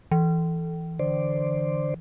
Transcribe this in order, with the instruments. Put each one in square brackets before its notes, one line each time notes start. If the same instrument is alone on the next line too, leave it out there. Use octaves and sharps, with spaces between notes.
[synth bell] E3
[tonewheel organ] D3 C5 D5